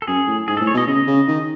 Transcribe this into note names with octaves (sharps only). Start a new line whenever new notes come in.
A4
F#2 G#4
A2
G#2 G#4
A4
A2
C#5
B2 D#5
C#3 D#5
C#3
D#3